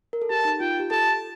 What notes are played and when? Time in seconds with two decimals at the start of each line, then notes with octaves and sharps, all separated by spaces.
0.13 A#4
0.22 A4
0.30 G4 A5
0.45 D#4
0.60 F4 G5
0.70 F4
0.80 G4
0.91 A4 A5